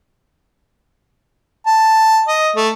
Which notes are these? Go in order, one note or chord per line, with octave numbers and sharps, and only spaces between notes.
A5
D#5
A3